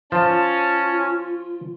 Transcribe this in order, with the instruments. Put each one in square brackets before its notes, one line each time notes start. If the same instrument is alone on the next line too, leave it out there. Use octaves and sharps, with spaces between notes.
[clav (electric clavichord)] F3 [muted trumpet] C#4 [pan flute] F4 [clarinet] A5